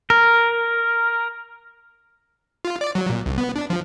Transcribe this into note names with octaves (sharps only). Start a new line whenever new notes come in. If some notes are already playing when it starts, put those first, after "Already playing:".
A#4
F4
D5
F#3
A#2
C2
B3
D4
F3